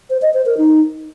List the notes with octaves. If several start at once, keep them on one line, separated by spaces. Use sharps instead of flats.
C5
D#5
C5
A#4
D#4